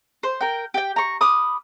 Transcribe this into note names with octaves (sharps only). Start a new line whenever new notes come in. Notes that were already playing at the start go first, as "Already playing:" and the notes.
C5
A#4 G5
G4 G5
A#5 C#6
B5 D6 D#6 F6